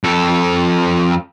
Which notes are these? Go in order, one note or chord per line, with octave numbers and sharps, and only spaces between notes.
F2 A4